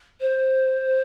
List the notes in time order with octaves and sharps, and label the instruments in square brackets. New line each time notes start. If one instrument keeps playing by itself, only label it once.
[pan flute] C5